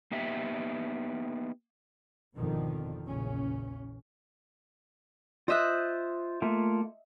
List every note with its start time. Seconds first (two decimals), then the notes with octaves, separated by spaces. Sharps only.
0.11 A#3 B3 D#4 G4 E5
2.35 G#1 F2 B2 D3 D#3 F3
3.05 A#1 E2 A#2 C#3 C#4
5.48 F4 C5 D#5 E5 D#6 F#6
6.42 A3 A#3 F4